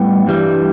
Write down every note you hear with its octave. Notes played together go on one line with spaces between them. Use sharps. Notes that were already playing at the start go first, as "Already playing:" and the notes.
Already playing: A2 G3 B3 G5
G2 E3 G3